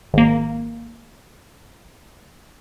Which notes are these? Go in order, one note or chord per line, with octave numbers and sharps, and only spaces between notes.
G#1 A#3